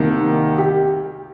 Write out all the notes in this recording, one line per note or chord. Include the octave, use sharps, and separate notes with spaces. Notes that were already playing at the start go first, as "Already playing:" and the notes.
Already playing: C2 C3 D#3 G3 A#3
G4